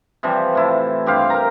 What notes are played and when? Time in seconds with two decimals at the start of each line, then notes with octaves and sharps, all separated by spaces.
0.23 C3 E3 F3 G3
0.55 A2 E4 A5
1.06 G2 G4 C5 F5
1.30 A#4 A#5